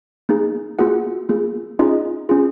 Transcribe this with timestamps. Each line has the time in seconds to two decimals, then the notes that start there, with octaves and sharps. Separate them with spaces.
0.29 A#3 D#4 G#4
0.79 A#3 F4 F#4 G#4 F#5
1.29 A#3 F4 G#4
1.79 C#4 D#4 F4 G#4 D#5
2.29 C#4 F4 G#4